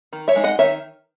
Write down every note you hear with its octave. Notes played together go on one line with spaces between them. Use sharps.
D#3
C#5 E5
G#3 D#4
D#5 F#5
D#3 C#5 E5